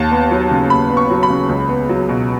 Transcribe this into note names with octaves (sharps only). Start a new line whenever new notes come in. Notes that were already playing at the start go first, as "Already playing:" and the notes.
Already playing: D#2 A5
B3
F#3
C#3
D#2 B5
B3
C#6
F#3
B5
C#3
C#2
B3
F#3
B2